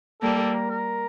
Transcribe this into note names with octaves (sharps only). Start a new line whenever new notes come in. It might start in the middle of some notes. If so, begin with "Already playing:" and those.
G3 A#3 A4
A4
A#4
A#4